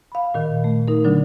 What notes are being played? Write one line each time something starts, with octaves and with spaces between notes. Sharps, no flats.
F5 B5
A#2 D#3
A3
D#4 A#4
D3 F#3 D4